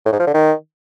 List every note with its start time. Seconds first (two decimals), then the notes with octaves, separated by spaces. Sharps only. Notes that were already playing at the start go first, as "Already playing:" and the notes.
0.05 A2
0.12 G#2
0.20 F3
0.27 D3
0.34 D#3